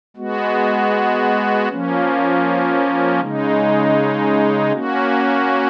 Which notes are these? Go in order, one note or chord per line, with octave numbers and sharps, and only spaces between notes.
G#3 B3 F#4
F3 A#3 C#4
C#3 G#3 D#4
A#3 C#4 F#4